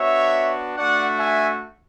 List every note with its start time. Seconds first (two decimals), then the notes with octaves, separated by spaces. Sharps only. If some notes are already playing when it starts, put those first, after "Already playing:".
Already playing: B3 D4 F#4 C#5 E5
0.76 A3 D4 F#4 D5 F#5
1.19 E5 G#5